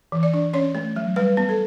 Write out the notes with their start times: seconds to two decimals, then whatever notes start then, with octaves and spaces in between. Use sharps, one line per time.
0.12 E3
0.23 D5
0.34 D4
0.53 C#4 C#5
0.75 A3
0.96 F#3
1.16 G3 B4
1.37 B3
1.49 A4